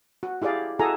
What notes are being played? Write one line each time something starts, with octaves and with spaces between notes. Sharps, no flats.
F#4
E4 G4 G#4 D5 F5
E4 F#4 G#4 A4 G#5 A#5